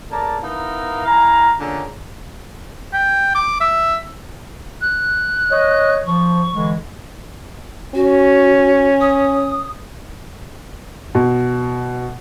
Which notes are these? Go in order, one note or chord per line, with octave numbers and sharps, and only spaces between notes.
C#3 A#3 A4 D5 A5 A#5
B3 D#4 E4 A#4 F5
E4 F5 G#5 A#5
A#2 D3 C#4 D4 G#4 A#4
G5
D6
E5
F#6
C#5 D#5
F3 C#6
D3 E3 G#3
C#4 F#4
D#6
B2